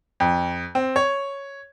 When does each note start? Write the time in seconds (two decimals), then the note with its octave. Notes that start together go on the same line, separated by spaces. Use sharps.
0.20 F2
0.75 C4
0.96 C#5